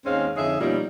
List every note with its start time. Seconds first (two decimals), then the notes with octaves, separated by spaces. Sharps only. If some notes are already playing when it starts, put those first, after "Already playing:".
0.06 D#2 G#2 G#3 C4 C#4 F5
0.36 F2 D3 D#4 G#4 C#5 E5
0.59 B2 F3 G3 A#3 C#4 D#4